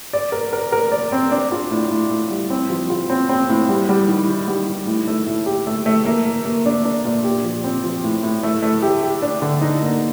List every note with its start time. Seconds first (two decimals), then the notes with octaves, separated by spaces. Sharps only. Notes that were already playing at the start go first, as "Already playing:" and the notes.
0.13 D5
0.32 A#4
0.53 A#4
0.72 A#4
0.92 D5
1.12 C4
1.31 D4
1.52 F4
1.71 A2
1.91 A2
2.10 A2
2.31 G3
2.50 C4
2.70 F3
2.90 F4
3.10 C4
3.29 C4
3.49 A2
3.69 G3
3.89 G3
4.08 D#3
4.28 D#3
4.48 G3
4.68 D#3
4.87 A2
5.08 A3
5.27 A2
5.46 G4
5.67 A3
5.86 A3
6.05 A#3
6.26 A#3
6.45 A#3
6.66 D4
6.85 D4
7.05 A#2
7.24 G4
7.44 F3
7.64 C4
7.84 F3
8.04 A2
8.23 A2
8.43 A3
8.62 A3
8.82 G4
9.03 G4
9.22 D4
9.42 D3
9.61 D#4
9.82 A#3